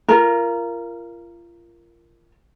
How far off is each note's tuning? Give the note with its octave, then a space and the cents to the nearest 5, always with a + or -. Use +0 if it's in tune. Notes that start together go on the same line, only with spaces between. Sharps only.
F4 -30 A#4 +0